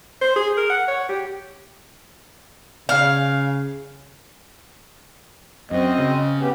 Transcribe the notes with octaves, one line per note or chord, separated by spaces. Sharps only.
C5
G#4
A#4
F#5
C#5
G4
C#3 F5
F#2 C4 D#5
C#3
G2 B3 G4